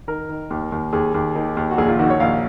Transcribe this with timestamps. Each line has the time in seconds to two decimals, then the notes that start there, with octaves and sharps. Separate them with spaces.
0.08 D#3 A#4
0.29 D#3
0.50 D#2
0.72 D#2
0.93 D#2 G#4
1.14 D#2
1.35 D#3
1.57 D#2
1.71 F#4
1.78 A#1 G#4
1.88 F4
1.99 D#3 F#4
2.10 C#5
2.20 A#1 F5